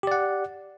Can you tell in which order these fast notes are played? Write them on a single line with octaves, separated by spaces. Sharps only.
G4 D5 F#5